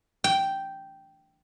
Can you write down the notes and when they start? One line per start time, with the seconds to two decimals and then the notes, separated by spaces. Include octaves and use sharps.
0.24 G5